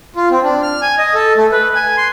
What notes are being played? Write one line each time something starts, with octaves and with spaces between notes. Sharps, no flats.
F4
C4
D4
F6
G#5
D#5
A4
A3
B4
G#5
C6